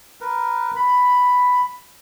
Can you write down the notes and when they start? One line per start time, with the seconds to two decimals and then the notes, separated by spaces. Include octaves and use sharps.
0.21 A#4 B4
0.76 B5